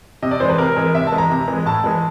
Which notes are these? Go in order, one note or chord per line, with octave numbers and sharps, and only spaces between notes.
C3 D#5
D5
E3 G#3 C5
B4
C3 A#4
E3 G#3
C3 E5
A5
E3 G#3
A#5
C3
E3 G#3
A2 A5
E3 G#3